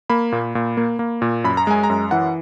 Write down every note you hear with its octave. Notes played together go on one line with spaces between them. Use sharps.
A#3 B5
A#2
A#2
A#3
A#3
A#2
F#2 B5
A#5
G#3 G#5
A#5
F#2
E3 F#5